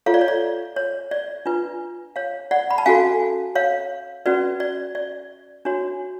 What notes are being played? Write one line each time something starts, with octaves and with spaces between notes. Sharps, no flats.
F4 A4 C#5 F5
D5
C#5
D5
C#5
D5
D4 F4 B4
C#5 F5
D5 F#5
B5
A5
C#4 F#4 A4 F5 G#5
C#5 F5
C#4 F#4 B4 D5
D5
D5
D4 F#4 C#5